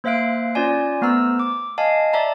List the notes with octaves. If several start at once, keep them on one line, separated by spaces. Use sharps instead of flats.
A#3 C5 E5 F5 F#6 D7
C#4 F4 D5 G#5
A3 B3 C5 A#5 E6
D6
D#5 F5 G#5 A5
D5 E5 A5 A#5